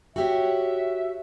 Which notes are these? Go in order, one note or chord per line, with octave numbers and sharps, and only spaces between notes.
F#4 G4 C#5 E5